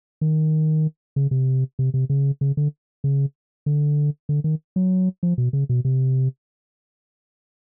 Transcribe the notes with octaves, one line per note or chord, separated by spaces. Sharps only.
D#3
C#3
C3
C3
C3
C#3
C#3
D3
C#3
D3
D3
D#3
F#3
F3
B2
C#3
B2
C3